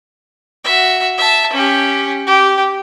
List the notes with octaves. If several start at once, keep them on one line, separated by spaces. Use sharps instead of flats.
F#4 E5
E5 A5
C#4 G4
G4